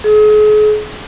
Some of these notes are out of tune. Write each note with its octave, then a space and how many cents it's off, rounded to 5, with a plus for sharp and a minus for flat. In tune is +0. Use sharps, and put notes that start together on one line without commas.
G#4 +40